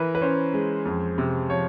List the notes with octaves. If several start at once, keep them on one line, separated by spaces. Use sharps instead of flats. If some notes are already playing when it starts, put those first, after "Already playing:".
Already playing: E3 E4 A#4 B4
B4
C#4 C5
G#3
F2
C3
F3 C#5